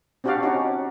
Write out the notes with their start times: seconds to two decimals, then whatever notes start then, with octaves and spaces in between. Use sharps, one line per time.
0.24 C4 D4 F#4 G4 D5 F5
0.43 C#4 D#4 F#4